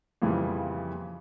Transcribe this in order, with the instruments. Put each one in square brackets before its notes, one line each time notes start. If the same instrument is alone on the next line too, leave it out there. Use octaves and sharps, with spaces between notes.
[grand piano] F2 A#2 C#3 E3 F3 G3